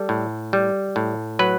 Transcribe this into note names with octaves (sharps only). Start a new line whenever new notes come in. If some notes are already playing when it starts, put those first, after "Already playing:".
Already playing: G3 A4
A2
G3
A2
F#3 B4